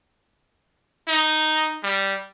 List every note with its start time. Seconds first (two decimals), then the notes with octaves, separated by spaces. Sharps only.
1.08 D#4
1.83 G3